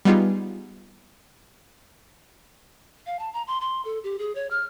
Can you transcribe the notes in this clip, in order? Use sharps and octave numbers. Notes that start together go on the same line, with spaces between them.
G3 B3 D#4 F4 G#4
F5
A5
A#5
C6
C6
A4
G4
G#4
C#5
F6